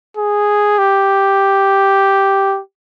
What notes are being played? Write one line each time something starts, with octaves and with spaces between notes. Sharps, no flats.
G#4
G4